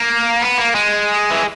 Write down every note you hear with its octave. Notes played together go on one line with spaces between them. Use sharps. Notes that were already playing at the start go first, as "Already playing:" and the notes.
Already playing: A#3
B3
A#3
G#3
E3